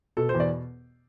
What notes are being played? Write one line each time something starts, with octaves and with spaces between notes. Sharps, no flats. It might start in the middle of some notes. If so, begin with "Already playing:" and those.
B2 A4
C5
E2
D5